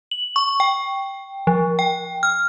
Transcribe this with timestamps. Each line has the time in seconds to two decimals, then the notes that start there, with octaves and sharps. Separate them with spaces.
0.11 F#7
0.36 C#6
0.60 G5
1.47 F3
1.79 G5
2.23 F6